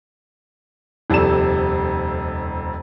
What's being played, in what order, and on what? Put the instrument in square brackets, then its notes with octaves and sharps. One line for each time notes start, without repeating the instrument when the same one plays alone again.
[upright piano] D#1 F2 C3 A4 D5 E7